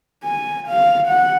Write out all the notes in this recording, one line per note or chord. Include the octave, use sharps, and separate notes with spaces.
G#5
F5
F#5